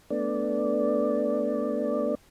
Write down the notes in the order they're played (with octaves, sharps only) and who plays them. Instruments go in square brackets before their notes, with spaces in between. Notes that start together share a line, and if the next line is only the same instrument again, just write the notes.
[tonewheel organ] A3 B3 D4 D5